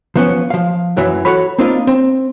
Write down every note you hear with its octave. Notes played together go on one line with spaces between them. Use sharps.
F3 B3 C#4
F3 F5
F#2 E3 F#3
F#4 A4 C#5 B5
A#3 C4 D4 D#4 F4
C4